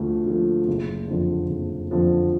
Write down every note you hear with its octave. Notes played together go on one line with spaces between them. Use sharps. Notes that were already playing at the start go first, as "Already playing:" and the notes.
Already playing: D2 D3 F3 A3
D3 F3 A3
F#1
F2 D3 F3
F#1
F2 D3 F3